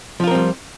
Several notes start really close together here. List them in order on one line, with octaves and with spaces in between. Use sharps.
F3 F4 A#4 C4 G3